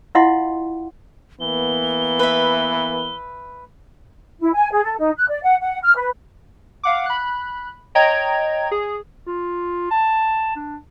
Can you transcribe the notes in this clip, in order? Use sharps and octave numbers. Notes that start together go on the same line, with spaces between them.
E4 F4 D#5 F5 F#5 C6
E3 A#3 B3 G7
B4 E5
E4
G#5
G#4
A4
D#4
F#6
D5
F#5
F#5
F6
B4
F5 F#5 D6
B5 F#6
C#5 D#5 G5 A#5 G#6
G#4
F4
A5
D4